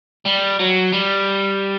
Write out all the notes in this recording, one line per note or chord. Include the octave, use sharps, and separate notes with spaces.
G3
F#3
G3